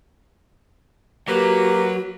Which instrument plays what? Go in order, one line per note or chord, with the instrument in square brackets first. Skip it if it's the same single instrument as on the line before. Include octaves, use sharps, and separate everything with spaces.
[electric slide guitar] F#3 [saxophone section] A#3 B4 [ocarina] F#4 [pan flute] G4